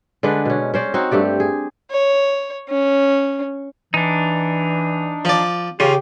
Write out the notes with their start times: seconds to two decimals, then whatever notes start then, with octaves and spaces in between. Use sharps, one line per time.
0.23 D3 G#3 D4 B4
0.45 B2 C#4
0.74 C#4 C5 D5
0.94 C4 D#4 F#4
1.11 G2 A3 G4 D5
1.40 G#4
1.91 C#5
2.69 C#4
3.94 E3 D4 D#4
5.25 F3 D5
5.80 C#3 F4 G4